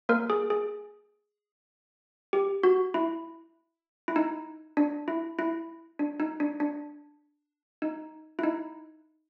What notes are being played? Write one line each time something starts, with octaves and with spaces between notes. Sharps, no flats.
A#3 A#4
G#4
G#4
G4
F#4
E4
E4
D#4
D4
E4
E4
D4
D#4
D4
D4
D#4
E4
D#4